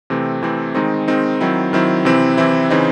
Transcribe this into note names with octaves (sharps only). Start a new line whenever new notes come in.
C3 E3 A3 C4
C3 E3 A3 C4
D#3 G#3 C4 D#4
D#3 G#3 C4 D#4
D#3 F#3 C4 E4
D#3 F#3 C4 E4
C3 E3 C4 E4
C3 E3 C4 E4
C#3 E3 C4 D#4